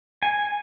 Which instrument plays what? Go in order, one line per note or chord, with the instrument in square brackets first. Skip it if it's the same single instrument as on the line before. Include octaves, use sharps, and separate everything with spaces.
[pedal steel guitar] G#5